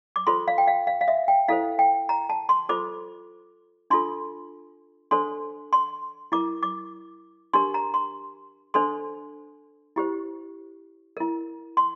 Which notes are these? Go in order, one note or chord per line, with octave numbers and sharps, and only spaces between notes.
D6
F4 A4 C5 C6
F5
G5
F5
F5
F5
E5
G5
E4 A4 C5 F5
G5
A#5
A5
C6
F4 A4 C5 D6
D4 F4 A4 C6
D4 A4 C5 C6
C6
E4 A#4 D6
D6
D4 G4 A#4 C6
A#5
C6
D4 A4 C5 C6
E4 G4 C5
E4 A#4
C6